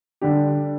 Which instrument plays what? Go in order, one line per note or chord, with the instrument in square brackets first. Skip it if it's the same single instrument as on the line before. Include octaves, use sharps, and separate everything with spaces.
[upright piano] D3 G3 D4 G4